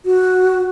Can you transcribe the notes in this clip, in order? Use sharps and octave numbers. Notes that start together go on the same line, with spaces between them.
F#4